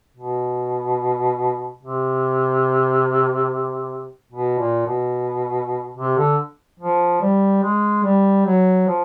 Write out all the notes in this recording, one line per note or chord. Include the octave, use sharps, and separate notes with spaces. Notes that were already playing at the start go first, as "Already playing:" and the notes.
B2
C3
B2
A#2
B2
C3
D3
F3
G3
G#3
G3
F#3
F3